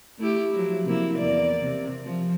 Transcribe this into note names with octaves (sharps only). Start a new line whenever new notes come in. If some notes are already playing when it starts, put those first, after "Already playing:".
A3 E4 G4
F3 F#3 E4
C3 A#3 E4
E2 A#3 D5
C3
F3